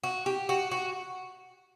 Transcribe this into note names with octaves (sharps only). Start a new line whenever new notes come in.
F#4
G4
F#4
F#4